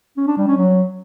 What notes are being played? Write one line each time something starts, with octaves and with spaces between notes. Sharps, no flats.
C#4
D4
G3
C#4
F#3